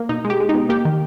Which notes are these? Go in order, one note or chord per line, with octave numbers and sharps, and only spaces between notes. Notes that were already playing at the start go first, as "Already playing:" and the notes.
Already playing: A#3
B2 D#4
G#3
G4
G#3
D#4
B2
A#3 G4
D#3